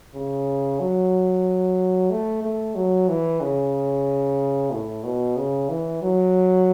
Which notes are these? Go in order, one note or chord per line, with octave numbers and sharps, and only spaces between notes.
C#3
F#3
A3
A3
F#3
E3
C#3
A2
B2
C#3
E3
F#3